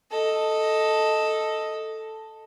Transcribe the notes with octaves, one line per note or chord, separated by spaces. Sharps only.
A4 D#5